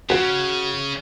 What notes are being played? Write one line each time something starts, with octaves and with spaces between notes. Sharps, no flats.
C#3 F#4